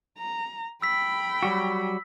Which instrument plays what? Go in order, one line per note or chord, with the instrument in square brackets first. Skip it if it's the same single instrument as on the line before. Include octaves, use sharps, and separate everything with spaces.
[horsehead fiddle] A#5
[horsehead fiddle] G5 B5 [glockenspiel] E6 B6
[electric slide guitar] F#3 G3 F#4